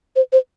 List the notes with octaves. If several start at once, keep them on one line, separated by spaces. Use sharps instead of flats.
C5
C5